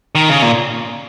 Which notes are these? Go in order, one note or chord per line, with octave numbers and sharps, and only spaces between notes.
D#3
C#3
A#2